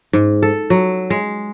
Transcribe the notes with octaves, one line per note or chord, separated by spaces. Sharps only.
G#2
A4
F#3
G#3